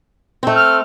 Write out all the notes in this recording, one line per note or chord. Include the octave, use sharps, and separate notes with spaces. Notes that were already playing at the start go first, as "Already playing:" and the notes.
A3 C4
F6